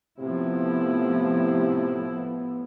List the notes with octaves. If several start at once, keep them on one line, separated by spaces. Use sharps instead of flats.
A2 C3 F3 B3 E4
B3